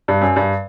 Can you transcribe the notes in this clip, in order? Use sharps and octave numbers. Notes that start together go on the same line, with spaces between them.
G2
F#2
G2